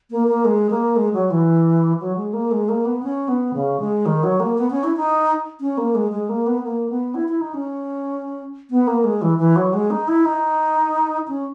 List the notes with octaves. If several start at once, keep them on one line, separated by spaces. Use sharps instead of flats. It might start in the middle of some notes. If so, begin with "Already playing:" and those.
A#3
A#3
G#3
A#3
G#3
F#3
E3
F#3
G#3
A#3
G#3
A#3
B3
C#4
B3
C#3
G#3
D#3
F#3
A#3
B3
C#4
E4
D#4
C#4
A#3
G#3
G#3
A#3
B3
A#3
B3
E4
E4
D#4
C#4
B3
A#3
G#3
E3
E3
F#3
G#3
D#4
E4
D#4
C#4